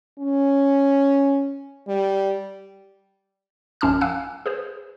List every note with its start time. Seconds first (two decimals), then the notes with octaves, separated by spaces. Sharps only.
0.19 C#4
1.88 G3
3.81 A#1 F#2 C#4 A5 D6 F6
4.01 F5 G#5 E6 F#6
4.46 G#4 B4 C5